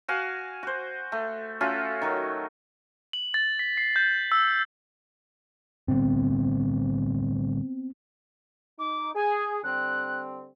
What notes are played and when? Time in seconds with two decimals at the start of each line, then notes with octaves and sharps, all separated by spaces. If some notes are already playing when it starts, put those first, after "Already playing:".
0.08 F#4 F5 G#5
0.63 F#4 C5
1.12 A3
1.61 A3 C#4 F4 F#4
2.02 D#3 F#3
3.13 F#7
3.34 A6
3.59 B6
3.77 C7
3.96 G6
4.32 E6
5.88 A2 D3 G3 B3 C4
8.79 D#4 D6
9.15 G#4 G#5
9.63 D3 G3 C4 F#6